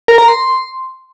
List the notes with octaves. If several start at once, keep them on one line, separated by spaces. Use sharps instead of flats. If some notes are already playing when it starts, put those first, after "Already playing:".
A#4
A#5
C6